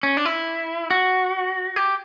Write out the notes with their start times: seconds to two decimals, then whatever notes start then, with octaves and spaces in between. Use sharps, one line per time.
0.03 C#4
0.17 D4
0.25 E4
0.90 F#4
1.76 G4